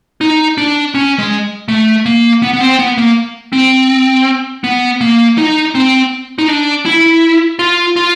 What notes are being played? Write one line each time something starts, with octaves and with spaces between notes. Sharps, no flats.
D#4
D4
C#4
G#3
A3
A#3
B3
B3
C4
B3
A#3
C4
B3
A#3
D#4
C4
D#4
D4
E4
F4
F4